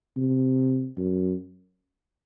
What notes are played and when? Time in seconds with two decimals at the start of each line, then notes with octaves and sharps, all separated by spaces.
0.16 C3
0.97 F#2